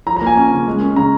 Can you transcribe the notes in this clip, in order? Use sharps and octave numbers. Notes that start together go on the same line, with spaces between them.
F3 A#5
A#5
A#3
G#5
C#4
C#3
G#3
C#4
C#3 A#5